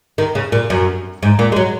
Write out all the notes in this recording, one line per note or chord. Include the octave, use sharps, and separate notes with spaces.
D#3
C#3
A#2
F#2
G#2
A#2
G#3
F#3